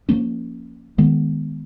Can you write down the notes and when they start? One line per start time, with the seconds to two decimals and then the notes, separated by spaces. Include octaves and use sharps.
0.09 F3 A#3 C#4
0.98 D#3 G#3 B3